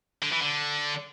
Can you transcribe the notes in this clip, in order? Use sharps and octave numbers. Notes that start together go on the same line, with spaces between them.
D3
E3
D3